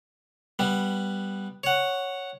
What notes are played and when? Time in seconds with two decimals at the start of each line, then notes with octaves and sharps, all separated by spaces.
0.59 G3 B3
1.64 C#5 F#5